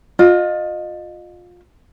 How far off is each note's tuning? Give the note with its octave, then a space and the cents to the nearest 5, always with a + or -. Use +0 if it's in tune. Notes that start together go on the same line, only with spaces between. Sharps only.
F4 +25 D#5 -20